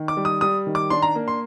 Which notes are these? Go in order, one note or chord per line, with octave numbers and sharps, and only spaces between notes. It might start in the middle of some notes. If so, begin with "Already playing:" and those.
Already playing: D#3
D6
G3
D#6
G3 D#6
D#3
D6
D4 C6
A#5
A#3
C6